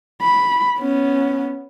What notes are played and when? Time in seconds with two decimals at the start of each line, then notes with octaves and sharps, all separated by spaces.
0.22 B5
0.79 B3 C#4